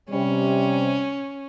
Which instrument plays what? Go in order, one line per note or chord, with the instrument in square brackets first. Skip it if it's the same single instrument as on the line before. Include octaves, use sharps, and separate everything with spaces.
[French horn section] C3 G3 [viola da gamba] C#4